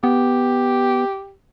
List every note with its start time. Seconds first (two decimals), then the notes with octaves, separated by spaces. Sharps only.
0.03 B3 G4